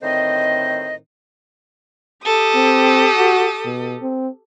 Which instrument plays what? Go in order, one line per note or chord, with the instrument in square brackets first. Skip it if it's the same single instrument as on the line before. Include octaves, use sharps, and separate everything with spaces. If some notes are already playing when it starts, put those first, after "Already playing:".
[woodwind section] A2 D3 D#3 C4 C5 D#5
[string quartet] G4 A4 D#6
[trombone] C4
F#4
B2
C4